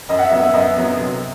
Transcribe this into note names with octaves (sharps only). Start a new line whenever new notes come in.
F#2 D#5
F#5
E5
F#3 B3
E5
F#2 D#5
F#3 B3
C3